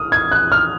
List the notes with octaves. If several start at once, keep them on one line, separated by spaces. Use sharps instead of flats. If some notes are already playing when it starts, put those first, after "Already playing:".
Already playing: D#6 F6
G#6
F#6
F6